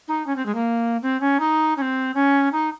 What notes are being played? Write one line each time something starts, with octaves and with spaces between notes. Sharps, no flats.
D#4
C#4
C4
G#3
A#3
C4
C#4
D#4
C#4
C4
C#4
D#4